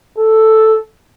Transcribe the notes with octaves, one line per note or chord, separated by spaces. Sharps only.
A4